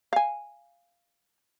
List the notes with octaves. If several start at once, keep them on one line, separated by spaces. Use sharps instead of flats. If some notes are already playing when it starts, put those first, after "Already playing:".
F5 G#5